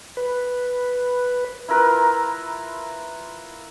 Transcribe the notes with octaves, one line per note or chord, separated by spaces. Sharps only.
B4
E4 F4 A#4 B4